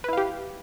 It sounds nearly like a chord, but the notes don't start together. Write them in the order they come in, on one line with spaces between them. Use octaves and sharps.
B4 E4 F5 G4